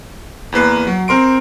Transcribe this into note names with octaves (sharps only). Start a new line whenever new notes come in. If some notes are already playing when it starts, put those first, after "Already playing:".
E2 A#3 B4 C7
F#3
C4 A#4 C6 D7